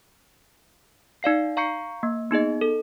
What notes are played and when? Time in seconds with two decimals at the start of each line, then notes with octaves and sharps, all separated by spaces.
1.23 D#4 D5 F5 C7
1.57 F5 A#5 C#6 G6 C7 C#7
2.03 A#3
2.31 B3 D#4 G#4 D#5
2.61 A4